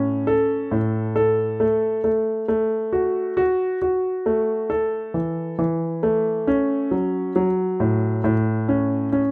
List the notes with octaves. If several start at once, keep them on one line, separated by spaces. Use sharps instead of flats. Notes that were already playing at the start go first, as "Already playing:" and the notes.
Already playing: A2 C#4
A4
A2
A4
A3
A3
A3
F#4
F#4
F#4
A3
A4
E3
E3
A3
C#4
F#3
F#3
A2
A2
C#4
C#4